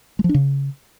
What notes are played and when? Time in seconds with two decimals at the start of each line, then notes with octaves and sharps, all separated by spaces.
0.19 G#3
0.24 F3
0.29 D4
0.34 C#3